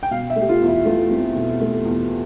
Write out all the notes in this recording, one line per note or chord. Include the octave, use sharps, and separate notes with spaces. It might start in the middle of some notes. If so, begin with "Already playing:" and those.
G5
B2 F5
E5
A3
G4
F4
E2
E4
A3 F4
C4
B2
A3
E2